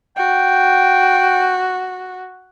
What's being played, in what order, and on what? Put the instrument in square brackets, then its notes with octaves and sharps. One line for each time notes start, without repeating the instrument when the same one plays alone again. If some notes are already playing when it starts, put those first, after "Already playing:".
[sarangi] F#4 [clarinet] G5